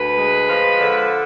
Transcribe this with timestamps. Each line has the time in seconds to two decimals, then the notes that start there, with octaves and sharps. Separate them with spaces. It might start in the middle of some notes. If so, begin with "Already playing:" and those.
Already playing: D2 B4
0.17 G#3
0.48 F3
0.81 D3